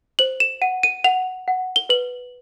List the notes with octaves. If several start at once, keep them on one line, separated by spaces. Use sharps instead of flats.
C5 F#7
E7
F#5 D#7
D#7
F#5 F7
F#5
G7
B4 F#7